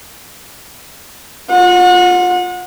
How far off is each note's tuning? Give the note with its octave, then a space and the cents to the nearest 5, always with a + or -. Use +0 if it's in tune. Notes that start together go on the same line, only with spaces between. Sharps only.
F4 +10 F#5 -30